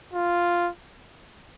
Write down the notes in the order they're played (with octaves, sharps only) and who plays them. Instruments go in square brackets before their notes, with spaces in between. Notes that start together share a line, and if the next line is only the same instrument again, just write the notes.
[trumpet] F4